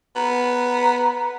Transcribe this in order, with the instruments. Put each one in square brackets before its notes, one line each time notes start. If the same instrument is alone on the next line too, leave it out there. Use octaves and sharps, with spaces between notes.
[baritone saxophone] B3 [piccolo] A#5